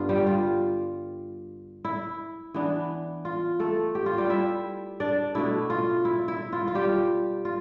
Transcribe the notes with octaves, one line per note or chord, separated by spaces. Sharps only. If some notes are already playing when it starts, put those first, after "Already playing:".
Already playing: G2 D3 B3 D4 F4
G3 G4
F4
E4
E3 B3 D4
F4
A3 A4
G4
F4
G3 G4
E4 E5
D4 D5
B2 A3 D4 E4
F4
E4
E4
F4
F4
G3 G4
F4